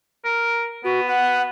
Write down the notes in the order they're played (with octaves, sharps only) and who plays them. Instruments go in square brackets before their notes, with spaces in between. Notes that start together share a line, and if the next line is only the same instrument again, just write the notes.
[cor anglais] A#4
[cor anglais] B3 [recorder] F#4
[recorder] F#5